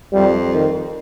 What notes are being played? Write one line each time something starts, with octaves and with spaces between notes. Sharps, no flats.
F2 G3
D#3